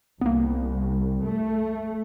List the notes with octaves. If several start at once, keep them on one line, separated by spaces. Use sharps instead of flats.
C2 A#3 B3
A3